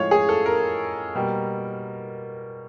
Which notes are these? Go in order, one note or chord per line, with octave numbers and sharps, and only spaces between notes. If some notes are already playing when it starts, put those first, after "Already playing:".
Already playing: A2 F3 G#3 C#5 F5
G#4
A4
A#4
B2 G3 A#3